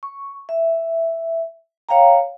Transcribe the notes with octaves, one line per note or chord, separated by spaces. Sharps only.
C#6
E5
C#5 F5 G5 A#5